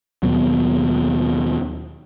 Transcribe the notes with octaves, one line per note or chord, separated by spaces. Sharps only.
D#2 B2 F#3